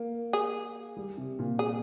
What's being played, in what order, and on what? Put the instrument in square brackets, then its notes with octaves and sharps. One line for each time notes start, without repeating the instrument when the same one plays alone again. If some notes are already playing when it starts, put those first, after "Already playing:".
Already playing: [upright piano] A#3
[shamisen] G#4
[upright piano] G3
C3
A#2
[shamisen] G#4